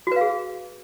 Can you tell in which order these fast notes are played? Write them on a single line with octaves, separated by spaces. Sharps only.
F#4 B4 F5 G#4